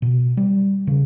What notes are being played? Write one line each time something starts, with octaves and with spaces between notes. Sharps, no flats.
B2
G3
C#3